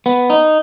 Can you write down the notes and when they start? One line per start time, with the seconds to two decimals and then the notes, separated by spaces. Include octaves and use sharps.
0.06 B3
0.30 D#4